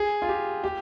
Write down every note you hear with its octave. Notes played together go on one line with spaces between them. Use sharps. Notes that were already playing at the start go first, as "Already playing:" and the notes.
Already playing: G#4
F4
G4
G4